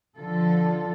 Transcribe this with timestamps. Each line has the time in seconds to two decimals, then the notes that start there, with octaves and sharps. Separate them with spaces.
0.17 D3 F3 F4 A4